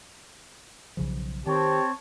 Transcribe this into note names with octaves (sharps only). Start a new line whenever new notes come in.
B1 C#3 F3
D#3 C4 G4 C#5 A5